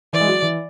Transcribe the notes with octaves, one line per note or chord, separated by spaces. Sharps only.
E3 D5
G#3
F#3
E3